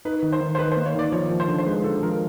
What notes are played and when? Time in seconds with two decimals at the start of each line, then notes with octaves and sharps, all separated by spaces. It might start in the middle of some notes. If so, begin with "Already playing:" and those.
0.05 D#4 B4
0.23 D#3
0.32 C5
0.41 D#3
0.55 C5
0.59 D#3 B4
0.72 C5
0.77 A#3
0.86 C#5
0.95 D#3 D5
1.12 F3 C#5
1.30 F3
1.40 C5
1.48 D3
1.58 C5
1.66 G#3 B4
1.84 D3 A4
2.03 F3 A#4